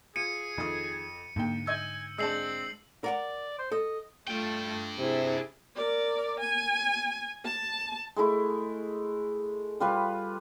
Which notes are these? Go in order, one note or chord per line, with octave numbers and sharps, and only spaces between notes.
F4 G#4 C#7 D#7
F2 D#3 A4 D#6
D#2 G#2 D3 G5
D#5 G#5 E6 G6
G#3 C4 D4 A5 E6 C7 F#7
A#4 D5 F#5 A#5
C5
A4 D#5
A3 D4 F4 G5
C3 E4 G#4
A#4 D5
G#5
A5
G#3 A3 E4
G3 F4 B4